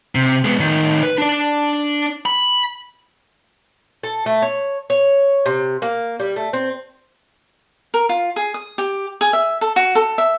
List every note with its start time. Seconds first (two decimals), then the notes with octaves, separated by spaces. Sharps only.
0.15 C3
0.44 G#3 B3
0.59 A2 D#3
1.03 B4
1.18 D4 D5
2.26 B5
4.03 A4
4.26 A3
4.42 C#5
4.90 C#5
5.46 C3
5.82 A#3
6.20 G3
6.36 A3
6.53 C4
7.94 A#4
8.09 F4
8.36 G#4
8.54 D#6
8.78 G4
9.21 G#4
9.33 E5
9.61 A4
9.76 F#4
9.95 A4
10.18 E5